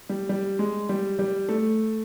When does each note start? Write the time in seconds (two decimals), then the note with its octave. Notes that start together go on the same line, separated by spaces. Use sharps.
0.09 G3
0.29 G3
0.59 G#3
0.89 G3
1.19 G3
1.49 A3